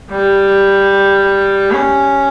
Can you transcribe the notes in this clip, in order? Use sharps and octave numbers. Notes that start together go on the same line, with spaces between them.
G3
C#4